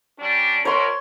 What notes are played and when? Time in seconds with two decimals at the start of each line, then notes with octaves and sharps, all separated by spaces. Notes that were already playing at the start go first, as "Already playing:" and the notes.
0.19 G3 C#4 D4
0.65 B2 A#4 C#5 C6